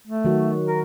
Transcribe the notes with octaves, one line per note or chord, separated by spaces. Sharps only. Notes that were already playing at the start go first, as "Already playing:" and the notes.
A3
D#3 F#3 F#4
A#4